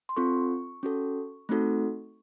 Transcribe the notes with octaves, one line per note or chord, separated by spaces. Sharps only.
C6
C4 F4 A4 C#6
C#4 F#4 A4
A3 C4 D#4 F#4 A4